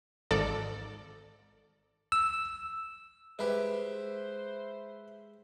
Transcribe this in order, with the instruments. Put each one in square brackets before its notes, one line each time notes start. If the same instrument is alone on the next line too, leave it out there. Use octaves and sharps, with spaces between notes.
[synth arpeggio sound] G#1 A4 D5
[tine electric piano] E6
[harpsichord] G#3 E4 G4 [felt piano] B4 E5 [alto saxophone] C5